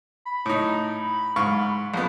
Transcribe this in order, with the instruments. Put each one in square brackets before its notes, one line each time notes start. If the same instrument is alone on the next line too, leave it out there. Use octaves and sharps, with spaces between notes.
[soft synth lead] B5
[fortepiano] A2 D#4
G#2 F5 C#6
A#1 B3